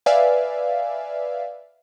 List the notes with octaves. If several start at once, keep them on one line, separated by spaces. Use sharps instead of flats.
B4 D5 E5 F5 G#5